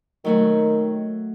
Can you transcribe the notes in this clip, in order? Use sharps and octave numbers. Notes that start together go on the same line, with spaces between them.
D#3 F#3 A3 F#4